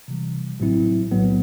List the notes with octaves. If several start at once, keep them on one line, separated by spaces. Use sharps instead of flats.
C3 E3 G3
A1 A2 F#3 C4 E4
B1 A2 F#3 B3